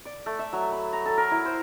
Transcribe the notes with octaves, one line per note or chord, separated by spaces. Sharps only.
D5
A3
E5
F#3
B5
A#5
A4
A#4
E4
C5